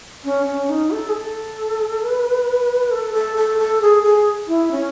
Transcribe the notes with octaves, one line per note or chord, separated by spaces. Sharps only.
C#4
C#4
D#4
A4
G#4
A4
B4
A4
A4
A4
A4
G#4
G#4
E4
C#4